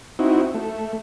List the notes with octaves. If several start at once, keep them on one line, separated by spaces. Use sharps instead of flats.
C4 D#4 E4 F#4
A3